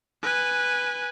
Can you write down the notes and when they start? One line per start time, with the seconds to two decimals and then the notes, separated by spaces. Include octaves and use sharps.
0.23 B4 G#5